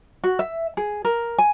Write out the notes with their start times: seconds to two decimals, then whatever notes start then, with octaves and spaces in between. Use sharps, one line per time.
0.24 F#4
0.39 E5
0.77 G#4
1.05 A#4
1.39 G#5